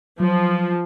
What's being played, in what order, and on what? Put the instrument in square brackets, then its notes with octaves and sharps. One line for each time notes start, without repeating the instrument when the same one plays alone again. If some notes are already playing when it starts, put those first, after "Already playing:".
[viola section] F3 [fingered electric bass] F#3